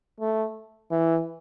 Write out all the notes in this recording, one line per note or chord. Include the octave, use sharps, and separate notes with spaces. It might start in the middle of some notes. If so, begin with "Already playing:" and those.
A3
E3